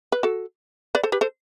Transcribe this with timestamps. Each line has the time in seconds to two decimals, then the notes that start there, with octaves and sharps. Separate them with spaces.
0.12 B4
0.23 F#4 A4
0.95 B4 D5
1.03 A4 C5
1.12 G4 B4
1.21 A4 C5